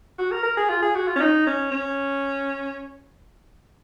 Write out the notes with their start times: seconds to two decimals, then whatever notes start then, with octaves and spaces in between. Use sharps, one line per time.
0.19 F#4
0.31 A#4
0.43 A#4
0.57 G#4
0.69 F4
0.83 G#4
0.95 F#4
1.08 F4
1.16 C#4
1.21 D#4
1.47 C#4
1.71 C#4